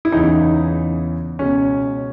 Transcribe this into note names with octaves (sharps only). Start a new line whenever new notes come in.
E4
E2 C#3 E3 D#4
C#2 B2 C#4